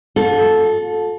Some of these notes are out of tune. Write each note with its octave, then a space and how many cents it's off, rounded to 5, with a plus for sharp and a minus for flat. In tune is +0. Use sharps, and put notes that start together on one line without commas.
F4 +45 A4 -10